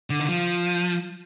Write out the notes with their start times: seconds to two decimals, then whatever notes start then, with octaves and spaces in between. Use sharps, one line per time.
0.10 D3
0.20 D#3
0.29 F3